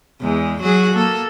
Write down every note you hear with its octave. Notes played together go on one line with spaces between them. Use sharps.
E2 G#3
F#3 F#4 G#4
A#3 A4